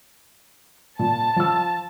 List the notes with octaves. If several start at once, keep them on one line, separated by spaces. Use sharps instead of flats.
A#2 A5
F3 E6